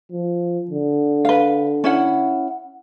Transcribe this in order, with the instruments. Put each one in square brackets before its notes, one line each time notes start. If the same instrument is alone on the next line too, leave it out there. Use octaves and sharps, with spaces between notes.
[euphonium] F3
D3
[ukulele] B4 F5
C#4 E4 F#5